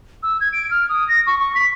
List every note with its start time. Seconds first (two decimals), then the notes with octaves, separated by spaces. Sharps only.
0.23 E6
0.41 G#6
0.53 D7
0.71 F6
0.89 D#6
1.08 A#6
1.27 C#6
1.39 C#6
1.55 B6